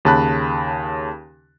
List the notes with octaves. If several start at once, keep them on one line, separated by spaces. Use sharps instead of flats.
D#2 C#3 A5 B5 F#6